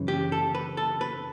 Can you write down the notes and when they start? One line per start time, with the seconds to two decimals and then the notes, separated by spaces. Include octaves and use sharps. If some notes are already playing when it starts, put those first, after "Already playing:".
Already playing: F#2 C#3 E3
0.08 G4
0.32 A4
0.55 B4
0.77 A4
1.01 B4